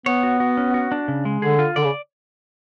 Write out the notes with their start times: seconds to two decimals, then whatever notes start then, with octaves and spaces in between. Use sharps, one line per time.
0.06 B3 C#5
0.23 F#4
0.40 F#4
0.57 C#4
0.74 F#4
0.92 D4
1.08 C#3
1.25 G#3
1.42 D3 G#4
1.59 F4
1.76 D3 D5
1.84 C#3